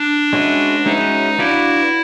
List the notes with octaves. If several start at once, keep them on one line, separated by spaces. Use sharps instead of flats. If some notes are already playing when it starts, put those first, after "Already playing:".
Already playing: D4
G#3 C#4 F#4 B4 E5
G#3 C#4 D#4 F#4 B4 E5
D4 E4 F#4 B4 D5 F5